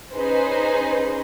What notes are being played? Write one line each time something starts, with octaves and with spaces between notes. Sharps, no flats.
C#4 D#4 G#4 B4 C5